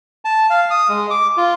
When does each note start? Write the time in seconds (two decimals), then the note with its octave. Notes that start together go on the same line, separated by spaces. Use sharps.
0.25 A5
0.50 F5
0.70 D#6
0.89 G#3
1.10 D6
1.37 F4